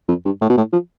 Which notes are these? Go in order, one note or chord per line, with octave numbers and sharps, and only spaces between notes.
F2
G2
A2
B2
A2
F3